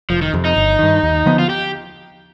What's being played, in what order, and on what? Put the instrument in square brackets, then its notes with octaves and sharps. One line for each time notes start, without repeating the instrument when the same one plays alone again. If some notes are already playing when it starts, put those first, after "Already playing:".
[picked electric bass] F1 [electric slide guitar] F3
[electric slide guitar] D#3
[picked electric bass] F2 C3
[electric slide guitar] D#4
[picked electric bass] G1
G2 D#3
D#2
D3 F3 B3
[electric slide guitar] F4
G4